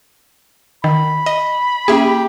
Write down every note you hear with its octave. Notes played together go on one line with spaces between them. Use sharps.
D#3 B5
D#5
A#3 C#4 G4 G#4 E5